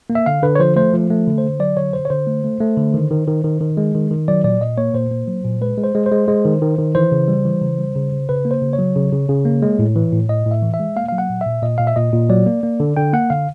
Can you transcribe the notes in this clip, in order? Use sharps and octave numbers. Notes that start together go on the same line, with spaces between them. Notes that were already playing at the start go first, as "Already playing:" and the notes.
A#3
E5
D3 F5
D3 B4
C#5
F3 C5
A3 C5
F3
A3
D3
C5
D3
F#3 D5
D3 C#5
D3 C5
C#5
D3 C5
A3
A3
A3
D3
D#3
D#3
D#3
D#3
D#3
G#3
D#3
D#3
F#3 D5
A#2 D5
A#2 D#5
A#3 C#5
A#2 C5
A#3
F#3
A#2
G#3 B4
G#3
C5
G#3
C5
G#3
G#3
D#3
D#3
D#3
E3 C5
C#3
G3
E3
C#3
G3
C#3
C#3
C#3 B4
A#3
C5
C#3
C#5
F#3
C#3
C#3
C#3
A#3
G#3
A2
E3
A2
A2 D#5
A2
E5
E3
E5
G#3
A#3 F5
F#3 F5
F#5
A#2
A#2 E5
A#2 D#5
A#2 F5
E5
A#2 D#5
A#2
F#3 D5
A#3
A#3
D3
D3 G5
A#3 F#5
D3 F5